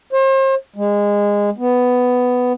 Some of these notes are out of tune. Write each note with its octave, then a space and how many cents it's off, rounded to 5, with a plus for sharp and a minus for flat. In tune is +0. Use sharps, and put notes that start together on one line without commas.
C5 +40
G#3 -20
B3 +10